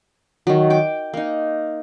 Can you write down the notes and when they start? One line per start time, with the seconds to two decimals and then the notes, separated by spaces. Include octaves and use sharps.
0.47 D#3 F#3
0.70 G5 D6
1.14 A#3 D#4